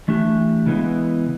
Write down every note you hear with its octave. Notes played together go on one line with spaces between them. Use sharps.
E3 A3 D4 G4
C#3 E3 G#3 B3